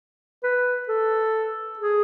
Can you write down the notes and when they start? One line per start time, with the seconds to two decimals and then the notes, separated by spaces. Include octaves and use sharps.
0.43 B4
0.88 A4
1.79 G#4